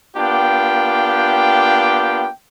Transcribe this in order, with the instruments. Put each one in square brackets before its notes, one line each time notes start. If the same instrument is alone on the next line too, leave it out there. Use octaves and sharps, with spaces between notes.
[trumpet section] A#3 B3 D4 F4 G4 G5